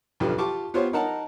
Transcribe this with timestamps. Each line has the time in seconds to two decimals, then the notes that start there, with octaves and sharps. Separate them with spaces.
0.20 B1 F2 D3 F4 G4 B4
0.38 F4 G4 A5 C#6 D6
0.74 B3 F4 G4 C5 C#5
0.93 D#4 A#4 F#5 A5